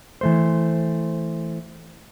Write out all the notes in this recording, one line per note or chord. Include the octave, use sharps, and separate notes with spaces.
E3 A3 C5